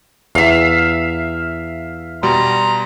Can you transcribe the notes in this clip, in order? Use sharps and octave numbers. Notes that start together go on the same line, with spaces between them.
E2 E5 F5
B2 G3 A#5 C6